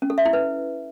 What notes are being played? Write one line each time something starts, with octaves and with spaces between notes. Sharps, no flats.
C#4
A4
E5
E4
B4